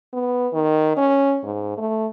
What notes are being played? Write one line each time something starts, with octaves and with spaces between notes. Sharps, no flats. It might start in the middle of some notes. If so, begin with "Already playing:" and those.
B3
D#3
C#4
G#2
A3